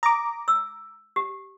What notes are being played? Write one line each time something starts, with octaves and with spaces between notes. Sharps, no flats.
A#5 D6 D#6
E6
G4